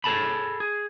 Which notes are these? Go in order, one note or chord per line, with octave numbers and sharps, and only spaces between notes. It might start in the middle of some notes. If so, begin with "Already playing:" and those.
G#4 A4 A5 B5
G#4